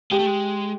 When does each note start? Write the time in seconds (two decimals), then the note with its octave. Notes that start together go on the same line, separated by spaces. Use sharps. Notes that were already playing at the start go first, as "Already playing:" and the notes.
0.11 G#3 G4
0.19 A3
0.26 G#3